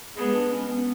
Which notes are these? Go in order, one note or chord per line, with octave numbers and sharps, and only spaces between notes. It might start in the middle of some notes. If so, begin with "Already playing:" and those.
G#3 B3 G#4
D4
C#4
B3